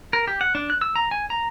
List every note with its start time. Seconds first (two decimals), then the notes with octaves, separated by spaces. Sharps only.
0.13 A#4
0.27 G4
0.41 F#5
0.55 D4
0.70 F#6
0.81 E6
0.96 A#5
1.11 G#5
1.30 A#5